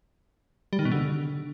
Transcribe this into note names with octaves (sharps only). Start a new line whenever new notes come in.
G3
D#3
B2
D3